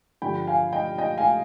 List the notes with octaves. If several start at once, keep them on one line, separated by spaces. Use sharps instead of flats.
G2 D3 F3 G5 B5
F5 G#5
D#5 G5
D#5 G5
F5 G#5